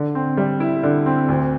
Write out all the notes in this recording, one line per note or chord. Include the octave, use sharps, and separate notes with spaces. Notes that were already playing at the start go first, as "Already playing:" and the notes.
Already playing: D3
C4
G3
E4
D3
C4
D2